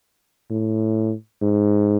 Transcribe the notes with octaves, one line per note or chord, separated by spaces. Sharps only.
A2
G#2